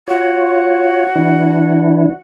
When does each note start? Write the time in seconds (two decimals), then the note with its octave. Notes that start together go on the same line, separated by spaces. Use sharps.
0.08 F4 F#4 C#5
1.15 E3 D4 E4